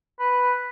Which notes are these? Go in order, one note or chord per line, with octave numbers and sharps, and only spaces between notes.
B4